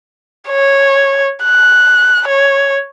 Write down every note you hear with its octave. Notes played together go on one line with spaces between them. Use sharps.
C#5
F#6
C#5